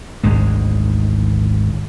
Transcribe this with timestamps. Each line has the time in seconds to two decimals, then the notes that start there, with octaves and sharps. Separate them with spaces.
0.24 G#1 D2 G#2 G#3